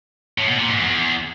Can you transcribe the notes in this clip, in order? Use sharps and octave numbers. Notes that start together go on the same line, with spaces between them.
A2
B2
A#2
G#2
E2